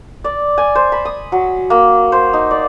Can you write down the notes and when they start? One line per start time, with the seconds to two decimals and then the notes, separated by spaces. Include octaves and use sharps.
0.24 D5
0.58 G#5
0.75 C5
0.92 B5
1.05 D#6
1.32 F#3
1.70 A#3
2.12 C5
2.33 D#4
2.51 D5